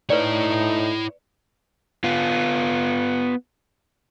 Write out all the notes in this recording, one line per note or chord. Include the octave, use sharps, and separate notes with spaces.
A2 D#4 E4 B4 C#5 D5
B3 F4